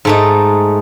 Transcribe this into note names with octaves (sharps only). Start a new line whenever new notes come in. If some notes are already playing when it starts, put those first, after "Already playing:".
G#2 A3 D#4